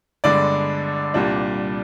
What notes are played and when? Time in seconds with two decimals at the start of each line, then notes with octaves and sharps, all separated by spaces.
0.24 G1 G2 D3 G#3 D4 D5
1.14 C2 A#2 G3 D4